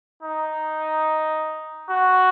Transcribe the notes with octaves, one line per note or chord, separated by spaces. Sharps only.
D#4
F#4